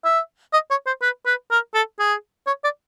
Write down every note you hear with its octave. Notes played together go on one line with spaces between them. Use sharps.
E5
D#5
C#5
C5
B4
B4
A#4
A4
G#4
C#5
D5